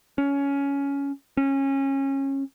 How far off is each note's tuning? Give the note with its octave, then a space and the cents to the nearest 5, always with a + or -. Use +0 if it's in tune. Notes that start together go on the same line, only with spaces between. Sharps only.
C#4 +15
C#4 -20